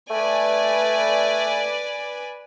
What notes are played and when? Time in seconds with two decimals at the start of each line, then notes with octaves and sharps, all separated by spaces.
0.10 A3 B4 D5 G#5